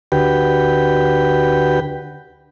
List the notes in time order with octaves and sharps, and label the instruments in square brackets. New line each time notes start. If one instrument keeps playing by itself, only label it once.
[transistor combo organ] D2 F#4 G4 B4 G5